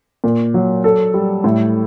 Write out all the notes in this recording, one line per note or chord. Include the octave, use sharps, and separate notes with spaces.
A#2
F#3
A4
G3
A2